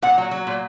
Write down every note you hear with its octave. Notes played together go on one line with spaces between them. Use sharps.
A#2 F#5
F#3
F#3
A#2